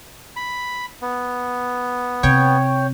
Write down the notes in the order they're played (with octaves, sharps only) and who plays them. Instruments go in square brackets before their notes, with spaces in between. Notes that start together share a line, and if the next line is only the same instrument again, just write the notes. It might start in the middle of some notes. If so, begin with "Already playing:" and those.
[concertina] B5
B3
[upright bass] C3 [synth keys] C#5 G5